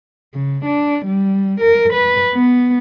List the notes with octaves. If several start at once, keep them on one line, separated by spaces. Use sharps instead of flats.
C#3
D4
G3
A#4
B4
B3